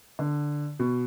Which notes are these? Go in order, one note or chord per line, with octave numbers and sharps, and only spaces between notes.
D3
B2